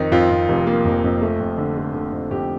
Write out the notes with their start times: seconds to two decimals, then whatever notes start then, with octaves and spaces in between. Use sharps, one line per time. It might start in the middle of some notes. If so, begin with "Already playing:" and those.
Already playing: F2 D#3 D#4
0.12 F2 F4
0.30 F2
0.48 F1
0.67 A#3
0.85 F1
1.04 F2
1.22 A3
1.40 F2
1.58 D3
1.76 A3
1.94 D3
2.12 F2
2.31 F2 G4